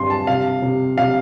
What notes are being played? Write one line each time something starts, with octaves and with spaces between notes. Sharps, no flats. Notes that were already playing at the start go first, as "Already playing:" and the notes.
Already playing: G2 C4 C6
A5
C3 F5
C3
C3 F5